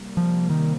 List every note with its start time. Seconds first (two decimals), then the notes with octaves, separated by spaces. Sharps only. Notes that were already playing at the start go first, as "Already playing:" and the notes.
Already playing: C3 G3 A#3
0.17 F3
0.50 D#3